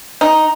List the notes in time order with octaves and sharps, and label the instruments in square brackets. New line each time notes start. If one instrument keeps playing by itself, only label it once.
[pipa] D#4